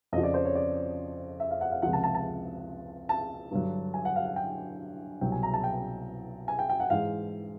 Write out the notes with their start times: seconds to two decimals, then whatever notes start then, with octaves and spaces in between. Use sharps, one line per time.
0.13 F2 D#5
0.15 C#3 F3
0.23 D5
0.34 C5
0.45 C#5
0.55 D5
1.40 E5
1.51 F5
1.61 F#5
1.71 F5
1.82 C#2 C3 F3 F#5
1.93 A5
2.04 A5
2.15 A5
3.09 A5
3.51 G2 D3 F#3
3.94 G#5
4.05 F#5
4.16 F5
4.26 F#5
4.36 G5
5.21 C2 B2 F#3 G5
5.32 G#5
5.43 A#5
5.54 A5
5.64 G5
6.48 G#5
6.59 G5
6.69 G5
6.80 F#5
6.90 G#2 E3 F5